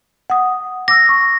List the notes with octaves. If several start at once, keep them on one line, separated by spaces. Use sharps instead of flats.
F#5 D#6
D6 E6 A#6
C#6